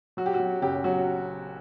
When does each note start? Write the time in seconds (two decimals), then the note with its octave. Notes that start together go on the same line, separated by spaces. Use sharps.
0.17 F#3 F#4
0.26 G4
0.34 F#4
0.40 F#3
0.62 F#1 G4
0.84 F#3 F#4